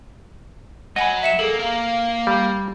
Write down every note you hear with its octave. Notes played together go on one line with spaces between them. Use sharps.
F#3 D#5 F#5 G#5 B5
E5 C#7 E7
A#3 G#4 A4
A#3 A#4 F5
G3